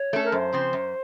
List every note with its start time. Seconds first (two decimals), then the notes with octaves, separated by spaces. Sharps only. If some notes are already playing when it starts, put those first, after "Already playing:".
Already playing: C#5
0.13 A3 C#4 A4
0.22 A#4
0.32 F#2 C5
0.53 C#3 F3 C4
0.73 F#2